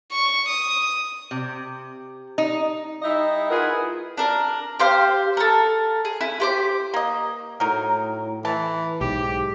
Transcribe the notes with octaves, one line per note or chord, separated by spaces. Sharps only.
C#6
D#6
C3
D#4
G3 D#4 E4 D#5 E5
E4 F4 G#4 A#4 B4 F#5
D4 A#4
G4 C5 F5
A4 A#4
G#4
E4
G4 C5 D6
A#3 D#5
A2 F#3 D#4 A#4
E3 A5
B1 G#2 G4